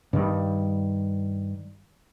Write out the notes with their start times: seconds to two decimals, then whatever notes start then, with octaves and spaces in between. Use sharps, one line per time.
0.13 G2 D#3 G3